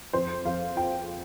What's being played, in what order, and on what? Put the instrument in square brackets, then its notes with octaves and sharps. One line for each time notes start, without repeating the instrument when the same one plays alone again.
[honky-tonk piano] F2 C5
F2 F5
F3 G5